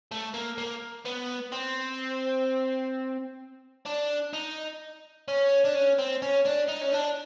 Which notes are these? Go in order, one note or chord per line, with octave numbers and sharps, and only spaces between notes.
A3
A#3
A#3
B3
C4
D4
D#4
C#4
D4
C#4
C4
C#4
D4
D#4
C#4
D4